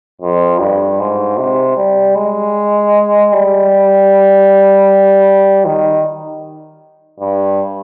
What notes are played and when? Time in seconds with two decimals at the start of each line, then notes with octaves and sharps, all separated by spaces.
0.21 F2
0.60 G2
1.00 G#2
1.38 C3
1.77 G3
2.16 G#3
3.33 G3
5.65 D#3
7.20 G2